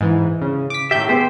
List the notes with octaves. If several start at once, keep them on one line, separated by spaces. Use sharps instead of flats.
G#2 E3
C#3
D6 B6
A2 D#3 G4 E5 G6
B3 G4 G#4 C5